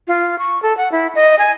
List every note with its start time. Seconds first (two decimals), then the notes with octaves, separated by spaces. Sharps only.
0.08 F4
0.39 C#6
0.62 A4
0.77 F#5
0.92 E4
1.15 D#5
1.39 G#5